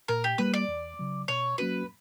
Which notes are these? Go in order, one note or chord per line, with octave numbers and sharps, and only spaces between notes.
A#2 A#4
G4
G3 A#3 B4
D5
E2
C#3 F#3
B2 C#5
F#3 A#3 C#4 F#4 B4